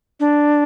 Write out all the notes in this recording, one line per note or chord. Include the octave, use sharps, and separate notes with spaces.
D4